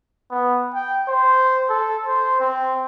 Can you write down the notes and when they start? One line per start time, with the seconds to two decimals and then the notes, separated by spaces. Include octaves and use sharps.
0.31 B3
0.74 G5
1.09 C5
1.69 A4
2.07 C5
2.40 C4